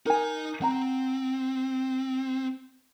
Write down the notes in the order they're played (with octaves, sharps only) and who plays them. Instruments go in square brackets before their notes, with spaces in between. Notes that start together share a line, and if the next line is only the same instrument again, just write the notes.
[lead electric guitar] D#4 A#5 [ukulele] A#4 G#5
[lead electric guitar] C4 [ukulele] F#5 A#5